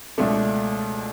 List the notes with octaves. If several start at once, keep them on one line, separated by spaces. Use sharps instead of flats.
C#2 B2 A3 D4